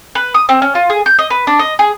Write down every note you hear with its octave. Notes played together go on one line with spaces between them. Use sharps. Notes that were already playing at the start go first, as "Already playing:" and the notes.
B4
D#6
C4
C#4
F4
G#4
G6
D#5
B4
D4
D#5
G#4